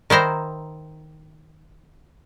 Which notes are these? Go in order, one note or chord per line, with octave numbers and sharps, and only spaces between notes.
D#3 E4 C5 A#5